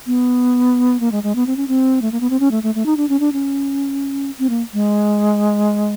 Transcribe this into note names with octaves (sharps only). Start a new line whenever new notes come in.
B3
A#3
G#3
G#3
B3
C4
C#4
C4
A3
A#3
B3
C4
C#4
A3
A3
A3
D#4
D4
C#4
D4
C#4
C4
A#3
G#3